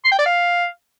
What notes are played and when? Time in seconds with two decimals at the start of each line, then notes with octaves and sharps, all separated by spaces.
0.04 C6
0.11 G5
0.19 D5
0.26 F5